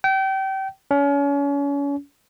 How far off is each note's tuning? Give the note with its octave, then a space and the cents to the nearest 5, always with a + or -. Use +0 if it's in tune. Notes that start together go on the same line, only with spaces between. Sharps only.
G5 -30
C#4 +35